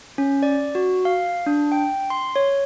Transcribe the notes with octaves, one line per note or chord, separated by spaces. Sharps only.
C#4
D5
F#4
F5
D4
G5
C6
C#5